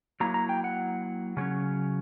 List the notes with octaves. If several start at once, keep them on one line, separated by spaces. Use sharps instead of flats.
F#3 A#3 E4 A#5
A#5
G5
F#5
C#3 F#3 C#4